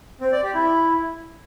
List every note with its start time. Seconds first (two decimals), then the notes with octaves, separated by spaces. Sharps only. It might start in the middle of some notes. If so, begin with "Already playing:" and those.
0.21 C4
0.32 D5
0.43 G4
0.55 E4